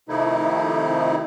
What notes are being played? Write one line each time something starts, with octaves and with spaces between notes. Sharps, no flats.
C3 D#3 F3 A3 D#4 E4